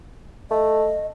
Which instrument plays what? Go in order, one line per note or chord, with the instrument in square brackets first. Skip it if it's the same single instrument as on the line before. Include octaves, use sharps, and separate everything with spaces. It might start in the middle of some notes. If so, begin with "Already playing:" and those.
[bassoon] A3 [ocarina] D#5